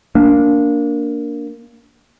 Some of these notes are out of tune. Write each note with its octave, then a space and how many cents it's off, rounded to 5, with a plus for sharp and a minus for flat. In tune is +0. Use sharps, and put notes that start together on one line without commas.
A#3 +0 D4 -15